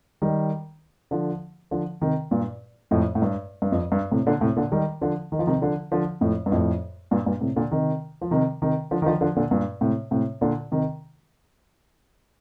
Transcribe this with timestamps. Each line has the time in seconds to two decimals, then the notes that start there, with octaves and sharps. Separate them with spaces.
0.22 D#3 G3
1.11 D3 F3
1.71 D3 F3
2.02 C3 D#3
2.31 G2 A#2
2.91 F2 A2
3.15 A2
3.22 G2
3.62 G2
3.72 F2
3.92 G2
4.12 A2 C3
4.27 A#2 D3
4.41 A2 C3
4.56 A#2 D3
4.72 D#3 G3
5.01 D3 F3
5.32 D#3
5.39 F3
5.47 C3 D#3
5.61 D3 F3
5.92 D3 F3
6.21 F2 A2
6.46 G2
6.52 F2 A2
7.11 G2 A#2
7.26 G2 A#2
7.41 A2 C3
7.56 A#2 D3
7.71 C3 D#3
8.21 F3
8.31 C3 D#3
8.62 C3 D#3
8.91 D3 F3
9.02 D#3
9.06 D3 F3
9.21 D3 F3
9.36 A#2 D3
9.51 G2 A#2
9.81 A2 C3
10.11 A2 C3
10.41 A#2 D3
10.71 C3 D#3